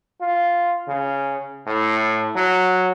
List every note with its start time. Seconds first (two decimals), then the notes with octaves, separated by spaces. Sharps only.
0.21 F4
0.88 C#3
1.67 A2
2.36 F#3